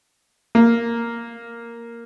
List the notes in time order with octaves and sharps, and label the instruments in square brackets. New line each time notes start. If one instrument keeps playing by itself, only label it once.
[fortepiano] A#3